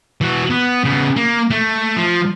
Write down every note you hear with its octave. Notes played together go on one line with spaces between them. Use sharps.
E3 F#4
B3
C#3 B3
A#3
A3
F3